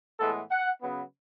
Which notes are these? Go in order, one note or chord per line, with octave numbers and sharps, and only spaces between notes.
A2 E3 G#3 B3 A4
F#5
C#3 F#3 B3